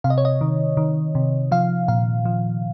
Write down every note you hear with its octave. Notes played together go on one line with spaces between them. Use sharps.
C3 F5
D#5
C#5
D#5
D#3
D#3
C3
F3 F5
A#2 F5
F3